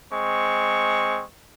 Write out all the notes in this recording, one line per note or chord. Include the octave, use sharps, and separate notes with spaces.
G#3 C4 C#6